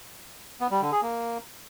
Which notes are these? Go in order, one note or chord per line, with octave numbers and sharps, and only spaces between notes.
B3
G3
D3
G#4
A#3